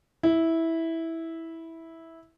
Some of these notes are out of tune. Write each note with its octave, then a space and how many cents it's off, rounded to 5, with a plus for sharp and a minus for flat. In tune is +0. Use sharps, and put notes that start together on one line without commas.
E4 -10